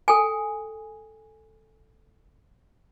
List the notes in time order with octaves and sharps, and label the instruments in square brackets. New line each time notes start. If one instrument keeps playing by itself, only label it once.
[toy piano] A4 G5 G#5